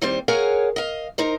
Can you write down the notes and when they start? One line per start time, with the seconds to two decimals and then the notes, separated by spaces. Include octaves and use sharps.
0.02 D#2 G3 C4 C5
0.28 G#4 A#4 C#5 F5 F#5 G#5
0.76 D#5 F5
1.18 D#4 A#4 C5